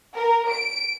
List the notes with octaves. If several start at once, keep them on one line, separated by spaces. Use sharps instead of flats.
A#4
D7